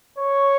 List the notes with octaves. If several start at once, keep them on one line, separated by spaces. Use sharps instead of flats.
C#5